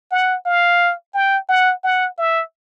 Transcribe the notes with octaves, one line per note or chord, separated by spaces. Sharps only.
F#5
F5
G5
F#5
F#5
E5